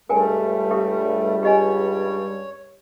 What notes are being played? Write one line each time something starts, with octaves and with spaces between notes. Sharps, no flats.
C#2 G2 G3 A3 A#4 G5 G#5
G4 E5 D#6
G4 C#5 D#5 G#5